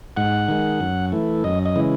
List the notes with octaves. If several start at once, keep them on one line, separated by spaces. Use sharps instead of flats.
G#2 F#5
D#3 G#3
F#2
E3 A3
F#2 D#5
D#5
C#3 E3 G#3